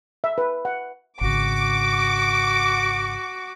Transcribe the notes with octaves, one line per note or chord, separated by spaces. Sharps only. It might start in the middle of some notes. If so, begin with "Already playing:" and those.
E5
B4
F#5
G#1 C#3 F#4 D6